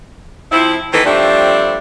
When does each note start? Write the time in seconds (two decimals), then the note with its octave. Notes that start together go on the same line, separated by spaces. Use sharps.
0.51 F3 C4 E4
0.93 D#3 E3 B3 C4 D#4 A4
1.04 F3 G3 A3 C4 D4